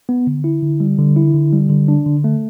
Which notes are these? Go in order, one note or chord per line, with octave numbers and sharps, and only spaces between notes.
B3
D3
E4
D3
G3
D3
E4
D3
G3
D3
D4
D3
A3